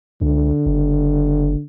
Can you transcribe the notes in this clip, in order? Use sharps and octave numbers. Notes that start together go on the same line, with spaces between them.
C#2 D3
F#1